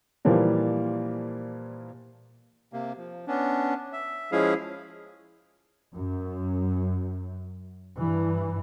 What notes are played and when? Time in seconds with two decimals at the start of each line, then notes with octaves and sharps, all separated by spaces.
0.25 A#2 E3 F3 G3 A#3
2.73 C3 A#3
2.97 F3
3.27 B3 C#4 D4
3.93 E5
4.32 F3 G#3 C#4 E4 G#4 F5
5.94 F#2
7.97 G2 E3